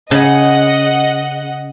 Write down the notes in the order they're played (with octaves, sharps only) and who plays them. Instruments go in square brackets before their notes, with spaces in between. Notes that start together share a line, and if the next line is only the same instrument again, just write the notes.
[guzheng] C#3 [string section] D#5 F#5